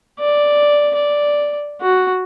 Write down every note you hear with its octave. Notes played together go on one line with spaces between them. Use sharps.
D5
D5
F#4